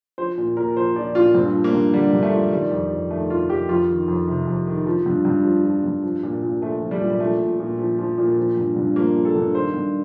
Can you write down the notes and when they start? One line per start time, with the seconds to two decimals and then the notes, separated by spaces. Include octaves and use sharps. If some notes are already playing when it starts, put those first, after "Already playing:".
0.18 F3 C5
0.38 A#2
0.57 A#2 A#4
0.76 F3 C5
0.96 F3 D5
1.15 A#2 F4
1.35 G2 C4
1.54 F3
1.64 A#3
1.73 G2
1.93 D3 G3
2.13 G2
2.23 A3
2.33 F3
2.52 D#3 G3
2.72 F2
2.91 F2
3.10 D#3 A3
3.30 D#3 F4
3.50 F2 G4
3.69 F2 F4
3.89 D#3
4.08 F2
4.28 C3
4.47 F2
4.67 D#3
4.86 F3
5.06 G2
5.25 G2
5.45 F3
5.65 F3
5.84 G2
6.03 F3
6.23 A#2
6.42 A#2
6.62 F3 A3
6.81 F3
6.91 G3
7.01 A#2
7.10 G3
7.20 F3 A3
7.40 A#2
7.60 A#2
7.79 F3
7.99 F3
8.18 A#2
8.37 F3
8.57 G2
8.76 G2
8.96 F3 A#3
9.16 F3
9.25 A4
9.36 G2
9.55 D#3 C5
9.74 G2